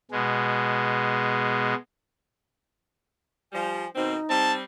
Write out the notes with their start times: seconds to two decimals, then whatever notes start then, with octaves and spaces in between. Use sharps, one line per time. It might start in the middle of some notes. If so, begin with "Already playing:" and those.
0.11 B2 G#3
3.53 F3 G3 G#5
3.95 B2 D#3 C4 D#4
4.30 G3 C4 A5